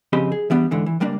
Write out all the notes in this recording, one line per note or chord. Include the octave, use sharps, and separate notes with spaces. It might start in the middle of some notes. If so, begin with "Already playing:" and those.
F2 C#3 C4 G4 D#5 B5
G#4
E3 G3 B3 D4
G#2 D3 E3
E3
C#2 G3 A#3 D4